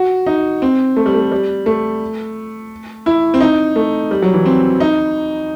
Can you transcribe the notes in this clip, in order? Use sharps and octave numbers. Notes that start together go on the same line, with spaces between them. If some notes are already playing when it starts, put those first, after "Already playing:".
Already playing: F#4
D#4
C4
A3
G3
A3
G3
A3
E4
C4
D#4
A3
G3
F#3
E3
C4
D#4